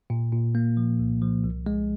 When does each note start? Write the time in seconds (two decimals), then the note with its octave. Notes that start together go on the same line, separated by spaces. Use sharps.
0.10 A#2
0.32 A#2
0.55 A#3
0.77 F3
0.99 C2
1.22 F3
1.44 C2
1.66 G#3